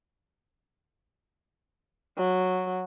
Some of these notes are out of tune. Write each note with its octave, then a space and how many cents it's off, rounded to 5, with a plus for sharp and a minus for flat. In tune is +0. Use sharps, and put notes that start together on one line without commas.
F#3 -10